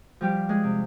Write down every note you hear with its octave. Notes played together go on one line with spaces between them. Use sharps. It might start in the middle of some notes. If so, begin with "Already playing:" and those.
F3 G3 G4
G#3 G#4
C3